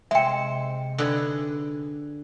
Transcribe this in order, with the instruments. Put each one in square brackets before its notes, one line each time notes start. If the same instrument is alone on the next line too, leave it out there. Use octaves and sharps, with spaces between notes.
[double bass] C3 [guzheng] G#3 C4 [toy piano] E5 G5
[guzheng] D3 G#4 B4